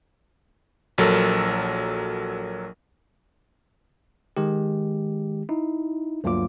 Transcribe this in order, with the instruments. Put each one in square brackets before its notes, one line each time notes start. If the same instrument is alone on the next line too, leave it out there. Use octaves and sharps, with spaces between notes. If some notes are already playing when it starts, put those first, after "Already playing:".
[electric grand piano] A#1 F#3 A4 A#4
[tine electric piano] D#3 G#3 G4
D#4 E4
D2 G2 F#3 A#3 F4 D6